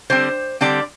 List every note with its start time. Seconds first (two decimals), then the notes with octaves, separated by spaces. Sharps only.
0.10 D3 G3 C4 C5
0.61 D3 G3 C4 D5